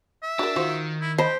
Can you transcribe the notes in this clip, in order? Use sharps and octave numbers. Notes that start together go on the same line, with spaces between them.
E5
D4 F#4 A#4
D#3 F4 F#4 C5
E4
G4 C5 D#5 A5 B5